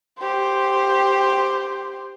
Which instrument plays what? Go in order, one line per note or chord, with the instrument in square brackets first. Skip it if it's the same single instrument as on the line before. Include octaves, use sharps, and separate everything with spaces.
[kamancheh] G4 C5